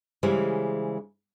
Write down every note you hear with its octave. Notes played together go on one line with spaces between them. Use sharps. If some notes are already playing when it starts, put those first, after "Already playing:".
C#3 E3 G3 G#3 C5